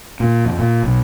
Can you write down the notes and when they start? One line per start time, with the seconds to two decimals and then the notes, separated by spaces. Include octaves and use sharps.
0.20 A#2
0.45 F2
0.59 A#2
0.83 B1